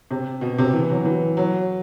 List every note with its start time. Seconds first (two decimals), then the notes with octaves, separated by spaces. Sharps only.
0.11 C3
0.41 B2
0.58 C3
0.74 E3
0.90 F#3
1.05 E3
1.37 F#3